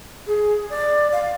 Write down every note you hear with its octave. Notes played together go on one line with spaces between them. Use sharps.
G#4
D5
F5